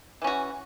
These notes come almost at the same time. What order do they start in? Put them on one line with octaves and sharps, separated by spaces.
E3 C#4 F#4